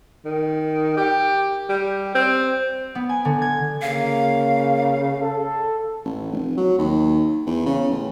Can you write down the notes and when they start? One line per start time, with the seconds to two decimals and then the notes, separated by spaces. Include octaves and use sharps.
0.25 D#3
0.97 G4
1.69 G3
2.15 C4
2.95 B3
3.09 G#5
3.25 D3
3.42 G#6
3.82 C#3 A#3 F5
5.21 A4
6.05 A1
6.32 F1
6.57 F#3
6.78 D#2
7.46 E2
7.66 C#3
7.91 A1